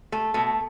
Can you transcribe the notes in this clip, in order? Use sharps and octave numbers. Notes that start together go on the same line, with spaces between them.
A3
B2 A3